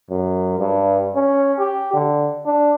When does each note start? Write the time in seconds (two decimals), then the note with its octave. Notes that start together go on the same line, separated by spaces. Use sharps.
0.10 F#2
0.59 G2
1.15 C#4
1.59 G4
1.94 D3
2.46 D4